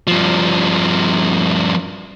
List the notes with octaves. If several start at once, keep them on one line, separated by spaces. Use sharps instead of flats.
G2 F3